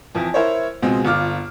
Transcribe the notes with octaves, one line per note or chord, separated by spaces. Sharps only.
F2 E3 F3
E4 A#4 C5 C#5
C#2 B2 G#3 C4
G1 F4 D6 F6